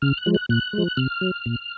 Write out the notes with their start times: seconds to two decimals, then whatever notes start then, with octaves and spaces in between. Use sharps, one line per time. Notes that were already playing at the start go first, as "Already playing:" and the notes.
0.02 C#3 F6
0.17 F#6
0.26 F3 G#3
0.34 F#6
0.49 A#2 F#6
0.73 F3 G#3
0.97 C3 F6
1.21 F#3
1.46 A#2